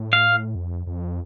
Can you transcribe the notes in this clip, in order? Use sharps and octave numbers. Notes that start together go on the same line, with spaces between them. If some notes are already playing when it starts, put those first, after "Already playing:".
Already playing: A2
F5
F2
F2